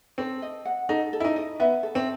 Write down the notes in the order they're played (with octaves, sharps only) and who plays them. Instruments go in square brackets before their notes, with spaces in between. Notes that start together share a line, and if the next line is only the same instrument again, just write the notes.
[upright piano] C4 [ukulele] A4
[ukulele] D#5
F#5
[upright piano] D#4 [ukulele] A4
[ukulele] A4
[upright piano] E4
D#4
[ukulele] D#5
[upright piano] B3 [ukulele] E5
[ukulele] A4
[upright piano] C4